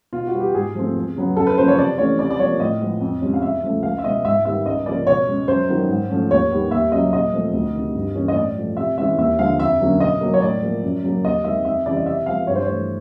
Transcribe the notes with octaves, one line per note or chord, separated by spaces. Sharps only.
B2 F4
F#4
G3 B3
G4
G#2 G#4
F3 A3 C4
E2
C#3 F#3 B3
F#2 A4
B4
C#3 F3 A#3 C5
C#5
C3 D5
E3 A3 C#4 C#5
C3 D5
D5
F3 A#3 C#5
A2 D#5
F3 G#3 B3
F2
C3 F3 G#3 C#4
F5
E2 E5
C#3 F3 A3
C#2 F5
E5
B2 G#3 D#5
G#2 E5
D#3 G3 B3 E5
C#2 D#5
C#3 F3 A#3 C#4 D5
B2 C#5
G#3 C#4
F#2 C5
D#3 F#3 B3
G#2
F3 A3 C#4
D#2 C#5
D#3 G3 B3
D#2 E5
C#3 F#3 D#5
A#2 D#5
F3 A3 C4
D2
C3 D#3
G2
E3 G3 A#3 C#4
D#5
A2 D5
F3 A3
C3 E5
E3 G#3 C#4 E5
D#2 E5
D3 F3 G#3 F5
F2 E5
D3 F#3 A#3 C#4
B2 D#5
F#3 A#3
C#5
A2 D5
F3 A#3
F#2
C#3 F#3 A#3
D#2 D#5
D#3 G#3 C4 E5
F2 E5
C#3 E3 G3 D5
D#5
C3 E5
F3 G#3 B3 F5
G2 C#5
C5
E3 A3 C#5